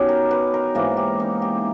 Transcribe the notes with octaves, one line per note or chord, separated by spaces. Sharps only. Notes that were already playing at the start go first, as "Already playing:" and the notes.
Already playing: B2 C#4 D#4 G4
A#4
B4
A#4
G#2 E3 A#3 A#4
G4
D#4
G4